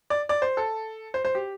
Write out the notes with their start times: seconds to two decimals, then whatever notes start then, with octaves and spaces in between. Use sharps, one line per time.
0.10 D5
0.29 D5
0.42 C5
0.57 A4
1.14 C5
1.25 C5
1.35 G4